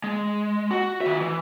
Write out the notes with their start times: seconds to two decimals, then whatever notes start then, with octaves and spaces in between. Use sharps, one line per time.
0.04 G#3
0.71 F#4
1.01 D#3 E5
1.21 E3